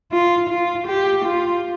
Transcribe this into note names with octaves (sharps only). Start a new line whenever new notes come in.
F4
F4
G4
F4